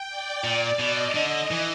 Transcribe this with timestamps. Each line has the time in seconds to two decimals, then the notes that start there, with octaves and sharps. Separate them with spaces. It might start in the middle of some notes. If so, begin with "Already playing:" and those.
Already playing: G5
0.09 D5
0.44 A#2 D5
0.79 B2 D#5
1.15 D3 D#5
1.51 E3